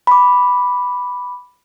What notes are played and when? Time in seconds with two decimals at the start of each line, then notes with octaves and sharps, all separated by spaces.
0.07 B5 D6